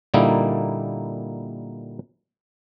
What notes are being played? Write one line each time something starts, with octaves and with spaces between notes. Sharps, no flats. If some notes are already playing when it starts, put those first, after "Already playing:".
A#2 D3 G3 A#3 D#4 E4